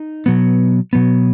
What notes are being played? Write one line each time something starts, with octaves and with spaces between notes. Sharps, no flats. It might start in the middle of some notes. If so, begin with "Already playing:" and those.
Already playing: D#4
B2 F#3 B3
B2 F#3 B3